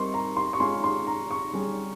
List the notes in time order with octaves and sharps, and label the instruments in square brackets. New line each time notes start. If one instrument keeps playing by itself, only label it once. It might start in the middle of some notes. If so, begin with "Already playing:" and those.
Already playing: [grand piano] G3 C4 D#4 A#4 [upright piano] C6 C#6
[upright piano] A#5
C6
C#6
[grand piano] G#3 C#4 F4 G#4 [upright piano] C6
[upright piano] C6
A#5
C#6
[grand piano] G3 C#4 G#4